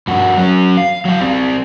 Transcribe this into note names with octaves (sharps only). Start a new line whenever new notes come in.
G2 F#4
F#3 C#4
F5
F#3 F5
G3 C4